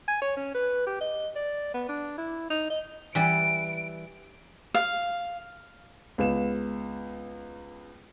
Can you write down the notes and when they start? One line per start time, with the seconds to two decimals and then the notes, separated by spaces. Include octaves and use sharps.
0.08 G#5
0.22 C#5
0.37 C#4
0.54 B4
0.86 G4
1.01 D#5
1.35 D5
1.74 B3
1.89 D4
2.18 E4
2.50 D#4
2.70 D#5
3.15 E3 G3 D7
4.74 F5
6.18 C#2 B3 E7